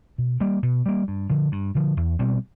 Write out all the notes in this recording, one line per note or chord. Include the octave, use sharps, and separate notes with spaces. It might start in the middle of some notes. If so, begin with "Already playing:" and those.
B2
G3 A#3
B2
G3 A#3
G2
D3 F3
G2
D3 F3
E2
B2 G3 C4